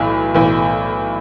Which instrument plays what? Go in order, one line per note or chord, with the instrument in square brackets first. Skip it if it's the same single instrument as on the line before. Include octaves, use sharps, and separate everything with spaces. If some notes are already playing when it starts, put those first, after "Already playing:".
Already playing: [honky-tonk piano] B1 A2 E3
B1 A2 E3